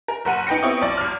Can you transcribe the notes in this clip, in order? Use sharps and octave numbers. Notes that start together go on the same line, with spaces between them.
A#4
F#1 A#4 F#5 D#7
D#4 B4 G5 A#6 C#7
B3 C4 E4 C#5 G5 D#6
B1 D5 D6
G#1 F6